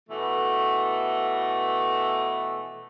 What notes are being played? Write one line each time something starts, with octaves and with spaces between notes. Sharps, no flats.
B2 E3 A3